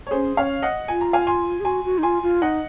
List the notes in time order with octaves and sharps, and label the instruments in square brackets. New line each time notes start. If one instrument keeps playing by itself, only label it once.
[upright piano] C#5
[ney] C#4 [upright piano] G#4 C5
[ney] C#4 [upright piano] C#5 F5
[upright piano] D#5 F#5
[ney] F4 [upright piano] G#5
[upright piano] A#5
F5 G#5
G#5 C6
[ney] G#4
[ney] F#4 [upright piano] G#5 C6
[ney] F#4
D#4
[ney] F4 [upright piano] G#5 C6
[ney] F4
[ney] D#4 [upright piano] D#5 F#5